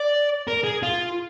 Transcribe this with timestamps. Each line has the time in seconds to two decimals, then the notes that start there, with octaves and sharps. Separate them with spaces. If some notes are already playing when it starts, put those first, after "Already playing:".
Already playing: D5
0.48 A#4
0.64 G#4
0.83 F4